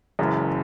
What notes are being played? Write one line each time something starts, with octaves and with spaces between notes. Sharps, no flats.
F#1 F#2 E3 G#3